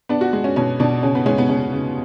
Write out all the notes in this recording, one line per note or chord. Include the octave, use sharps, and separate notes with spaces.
B3 D4
F#4
G#3
C#4
B2 C#4
B2 D4
C#3 C#4
B3
G#3 C#4
B3
C#3 C#4
C#3